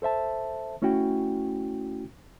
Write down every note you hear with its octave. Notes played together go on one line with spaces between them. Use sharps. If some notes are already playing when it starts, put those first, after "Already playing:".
A4 C5 E5 A5
A3 C#4 E4 F#4 G5